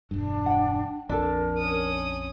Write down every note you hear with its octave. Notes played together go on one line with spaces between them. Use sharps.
E1 G2 D4
F#5 G5
A#1 F2 D4 A4 A#4
C#4 D#6